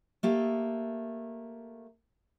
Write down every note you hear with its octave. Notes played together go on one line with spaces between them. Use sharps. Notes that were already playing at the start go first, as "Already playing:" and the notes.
A3 A#3 G4 A4